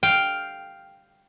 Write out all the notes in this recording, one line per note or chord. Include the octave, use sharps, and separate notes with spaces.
F5 G5